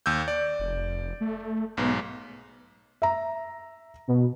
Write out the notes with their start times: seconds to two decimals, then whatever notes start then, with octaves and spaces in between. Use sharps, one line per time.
0.06 D#2 E6 G6
0.28 D5
0.59 F1
1.21 A3
1.77 B1 G#2 B3
3.02 E5 A#5
4.08 B2